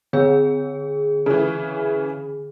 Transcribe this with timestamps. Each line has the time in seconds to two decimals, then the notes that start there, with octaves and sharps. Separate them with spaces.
0.13 D3 G#4
1.26 C#3 E3